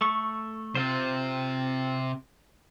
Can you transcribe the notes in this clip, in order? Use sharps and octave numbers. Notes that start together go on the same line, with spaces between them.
A3 C#6
C3 C4 F4 C5